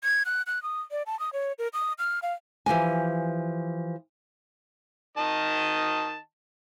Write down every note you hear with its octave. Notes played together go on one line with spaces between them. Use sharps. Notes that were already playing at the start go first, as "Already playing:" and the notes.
G#6
F#6
F#6
D#6
D5
A5
D#6
C#5
A#4
D#6
F6
F5
E3 F3 G4 G#5
D#3 D#5 A5